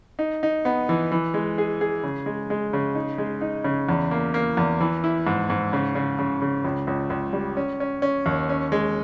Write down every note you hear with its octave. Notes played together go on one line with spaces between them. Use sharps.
D#4
D#4
B3
E3
E3
G#3
G#4
G#4
C#3
G#3
G#3
C#3
D#4
G#3
D#4
C#3
E2
A#3
A#3
E2
E3
E4
G#2
G#2
C#3
C#3
C#3
C#3
C#2
C#2
C#2
G3
C#4
C#4
C#4
D#2
C#4
G#3